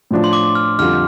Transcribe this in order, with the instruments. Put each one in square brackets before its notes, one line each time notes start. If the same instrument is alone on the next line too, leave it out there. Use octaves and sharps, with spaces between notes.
[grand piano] A2 F3 D4 F4
[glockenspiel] C6
D6
F6
[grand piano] F2 D3 G3 F4 [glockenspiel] F6